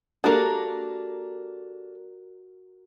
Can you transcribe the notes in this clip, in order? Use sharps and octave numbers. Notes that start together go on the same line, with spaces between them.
A#3 D4 F#4 G4 A4 A#4